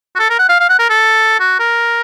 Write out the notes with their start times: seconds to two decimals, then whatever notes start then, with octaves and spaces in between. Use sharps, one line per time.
0.15 F#4
0.19 A4
0.30 A#4
0.39 F#5
0.49 F5
0.60 F5
0.69 F#5
0.79 A#4
0.90 A4
1.40 F#4
1.59 A#4